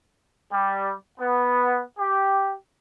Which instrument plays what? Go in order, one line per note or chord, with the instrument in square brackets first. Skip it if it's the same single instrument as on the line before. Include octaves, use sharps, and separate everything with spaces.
[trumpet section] G3
B3
G4